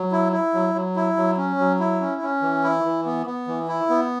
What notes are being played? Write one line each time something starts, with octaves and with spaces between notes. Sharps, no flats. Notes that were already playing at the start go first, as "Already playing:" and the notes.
Already playing: F#3
E4
E4
F#3
F#3
E4
F#3
C#4
F#3
E4
C#4
C#4
E3
E4
E3
B3
B3
E3
E4
B3